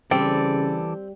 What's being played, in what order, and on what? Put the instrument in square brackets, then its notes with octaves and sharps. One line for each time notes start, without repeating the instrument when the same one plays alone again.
[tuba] C#3 [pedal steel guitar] E3 A4 D5 [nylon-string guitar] G3 [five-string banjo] C4